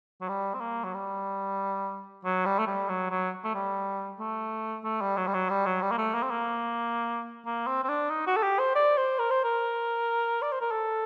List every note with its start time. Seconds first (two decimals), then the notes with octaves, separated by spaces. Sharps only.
0.21 F#3
0.29 G3
0.54 C4
0.61 A#3
0.84 F#3
0.94 G3
2.24 F#3
2.46 G3
2.59 A3
2.67 G3
2.89 F#3
3.11 F#3
3.44 A3
3.54 G3
4.19 A3
4.84 A3
5.01 G3
5.17 F#3
5.27 G3
5.34 F#3
5.50 G3
5.66 F#3
5.82 G3
5.91 A#3
5.98 A3
6.15 A#3
6.23 C4
6.31 A#3
7.45 A#3
7.67 C4
7.83 C4
7.89 D4
8.10 D#4
8.27 F#4
8.36 A4
8.43 G4
8.59 C5
8.76 D5
8.97 C5
9.19 A#4
9.31 C5
9.44 A#4
10.42 D5
10.52 C5
10.61 A#4
10.71 A4